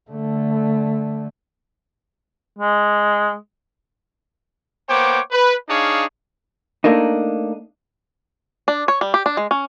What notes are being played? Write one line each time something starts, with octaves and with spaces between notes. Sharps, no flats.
D3 A3
G#3
A#3 B3 C5 C#5 G5 D6
B4
D4 D#4 G#4 C#5 F5
A3 A#3 D4 D#4
D4
C#5
G3
G4
D4
G#3
C#4